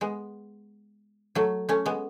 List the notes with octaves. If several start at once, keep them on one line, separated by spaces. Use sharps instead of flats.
G#3 B3
F#3 A3
A3 C#4
G#3 B3